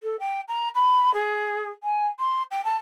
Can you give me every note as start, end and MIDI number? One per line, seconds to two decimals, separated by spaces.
0.03 0.16 69
0.20 0.41 79
0.48 0.69 82
0.75 1.13 83
1.14 1.70 68
1.83 2.07 80
2.19 2.43 84
2.51 2.64 79
2.65 2.76 81